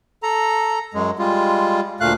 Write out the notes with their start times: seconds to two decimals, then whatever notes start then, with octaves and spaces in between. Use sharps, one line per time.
0.23 A4 A#5
0.94 F#2 G#3
1.19 G3 G#3 F4
2.00 D2 A#2 A3 F5 F#6